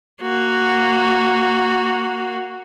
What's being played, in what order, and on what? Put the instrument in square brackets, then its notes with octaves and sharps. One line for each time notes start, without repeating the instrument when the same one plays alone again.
[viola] A#3 F#4